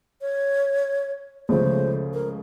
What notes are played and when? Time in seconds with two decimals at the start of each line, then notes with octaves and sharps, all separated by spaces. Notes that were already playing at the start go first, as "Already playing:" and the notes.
0.21 C#5
1.49 C#2 C#3 F3 A3 C5
2.14 A#4